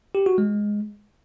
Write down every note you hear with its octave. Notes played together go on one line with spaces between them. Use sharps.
G4
F#4
G#3